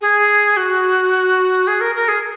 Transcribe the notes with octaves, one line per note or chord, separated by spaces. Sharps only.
G#4
F#4
G#4
A#4
A#4
G#4